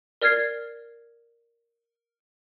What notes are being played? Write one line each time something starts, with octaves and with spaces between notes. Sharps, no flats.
A#4 D5 F6 G#6 C7